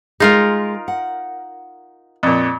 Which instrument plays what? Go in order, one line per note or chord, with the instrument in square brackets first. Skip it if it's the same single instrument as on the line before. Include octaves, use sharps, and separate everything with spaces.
[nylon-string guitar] G#3 G#4 [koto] D#4 F4 A#4
[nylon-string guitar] F#5
[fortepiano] F2 A#2